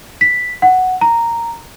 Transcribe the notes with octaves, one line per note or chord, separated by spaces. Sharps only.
B6
F#5
A#5